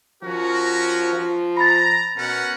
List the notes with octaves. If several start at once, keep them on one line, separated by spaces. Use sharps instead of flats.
F3 C#4 F#4 A#4
F3
A#5 B5 A6
B2 C#4 A#4 F#5